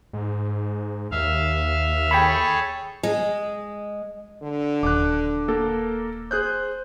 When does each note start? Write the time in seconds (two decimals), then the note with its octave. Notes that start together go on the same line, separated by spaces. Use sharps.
0.13 G#2
1.11 D#2 E5 F5
2.11 G#4 A4 C#5 G5 B5
3.03 G#3
4.43 D3
4.83 D#1 D6 F#6
5.48 A#3 A4 A#4
6.31 G#4 C5 F#6 G6